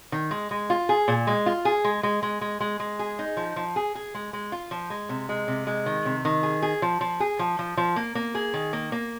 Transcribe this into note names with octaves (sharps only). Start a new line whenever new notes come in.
D#3
G#3
G#3
F4
G#4
A#2
G#3
F4
G#4
G#3
G#3
G#3
G#3
G#3
G#3
G#4
D#4
F3
F3
G#4
G#4
G#3
G#3
F4
F3
G#3
C3
G#3
C3
G#3
D#3
C3
D#3
G#4
G#4
F3
F3
G#4
F3
F3
F3
A#3
A#3
G#4
D#3
A#3
A#3